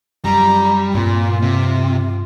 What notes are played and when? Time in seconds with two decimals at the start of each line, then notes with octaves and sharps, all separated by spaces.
0.25 F#2 G3 A#5
0.95 G2 A#2 C4 F4
1.42 C3